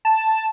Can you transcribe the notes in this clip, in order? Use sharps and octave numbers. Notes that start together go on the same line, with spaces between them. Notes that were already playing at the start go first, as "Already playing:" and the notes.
A5